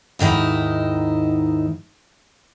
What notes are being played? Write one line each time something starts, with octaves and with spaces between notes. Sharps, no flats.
D#2 G#2 D#3 D#4 E4